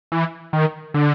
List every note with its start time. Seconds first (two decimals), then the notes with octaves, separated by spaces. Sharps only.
0.12 E3
0.53 D#3
0.94 D3